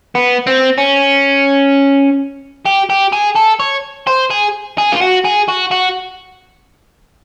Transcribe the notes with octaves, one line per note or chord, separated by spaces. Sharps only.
B3
C4
C#4
G4
G4
G#4
A4
C#5
C5
G#4
G#4
F4
F#4
G#4
F#4
F#4